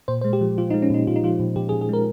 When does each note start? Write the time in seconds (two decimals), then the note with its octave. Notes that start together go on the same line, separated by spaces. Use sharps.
0.08 A#2 C5
0.21 C5
0.24 G#3
0.33 G4
0.41 F3
0.58 F3 F4
0.70 D#4
0.74 G#3
0.82 C#4
0.90 A#2 D#4
1.07 A#2 F4
1.16 D#4
1.23 F3 F4
1.40 A#2
1.56 A#2 G4
1.69 G#4
1.72 A#2
1.81 G#4
1.89 G#3 A#4